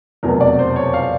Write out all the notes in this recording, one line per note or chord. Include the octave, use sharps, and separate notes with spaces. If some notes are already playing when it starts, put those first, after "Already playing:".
F1 E2 B2 F#3 A#4
D5
C5
C#5
F5